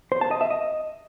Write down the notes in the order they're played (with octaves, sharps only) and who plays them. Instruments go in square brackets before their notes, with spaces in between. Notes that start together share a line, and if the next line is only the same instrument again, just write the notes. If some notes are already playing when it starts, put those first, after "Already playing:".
[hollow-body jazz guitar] C5
A5
D#5
E5
D#5